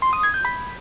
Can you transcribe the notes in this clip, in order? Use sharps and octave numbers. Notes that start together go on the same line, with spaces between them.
C6
D#6
G#6
G6
B5